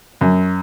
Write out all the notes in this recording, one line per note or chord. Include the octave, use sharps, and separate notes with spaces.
F#2